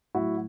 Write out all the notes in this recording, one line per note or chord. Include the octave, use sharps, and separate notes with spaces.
A2 F#3 E4 F#4